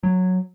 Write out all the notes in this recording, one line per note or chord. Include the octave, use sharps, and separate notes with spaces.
F#3